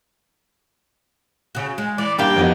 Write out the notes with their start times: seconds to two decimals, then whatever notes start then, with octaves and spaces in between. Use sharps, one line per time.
1.55 C#3 F#4
1.78 G#3
1.98 E3 D5
2.19 G2 A#3 G4 F5 G5
2.36 F2 B3 D#4